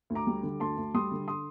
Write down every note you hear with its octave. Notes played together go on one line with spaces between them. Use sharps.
D2
A#5 D6
G3
D3
D2 A5 C6
D2
G3 C6 D#6
D3
C6 D#6